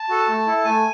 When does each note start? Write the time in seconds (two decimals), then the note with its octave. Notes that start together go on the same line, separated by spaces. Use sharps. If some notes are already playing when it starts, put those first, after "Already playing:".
Already playing: A5
0.09 F#4 A4
0.28 A3
0.47 E4 A4
0.65 A3 G#5